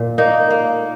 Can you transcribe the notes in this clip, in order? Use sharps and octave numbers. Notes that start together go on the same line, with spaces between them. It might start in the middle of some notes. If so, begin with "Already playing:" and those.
Already playing: A#2
A#3 D#4
A#3